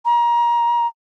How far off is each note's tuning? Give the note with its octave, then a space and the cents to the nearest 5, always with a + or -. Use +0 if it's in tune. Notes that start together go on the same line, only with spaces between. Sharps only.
A#5 +25